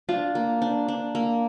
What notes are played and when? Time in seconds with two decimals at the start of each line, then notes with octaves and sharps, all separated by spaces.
0.09 D4 F4
0.35 A#3
0.62 D4
0.88 D4
1.15 A#3